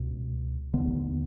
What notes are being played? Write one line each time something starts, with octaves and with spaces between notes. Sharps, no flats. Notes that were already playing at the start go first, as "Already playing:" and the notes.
Already playing: C#2 B2
D#2 D3 B3